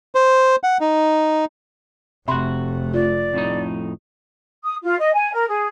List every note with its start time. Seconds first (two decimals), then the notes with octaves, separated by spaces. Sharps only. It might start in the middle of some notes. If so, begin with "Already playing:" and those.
0.15 C5
0.63 F#5
0.80 D#4
2.28 F1 C3 A3 F#4 E5 B5 C6
2.94 F4 D5
3.34 F2 A2 D#4
4.64 D#6
4.82 F4
4.98 D#5
5.14 G#5
5.32 A#4
5.49 G#4